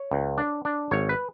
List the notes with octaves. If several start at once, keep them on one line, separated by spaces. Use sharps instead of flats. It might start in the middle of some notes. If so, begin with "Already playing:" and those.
Already playing: C#5
C#2
D4
D4
G#1 C#5
B4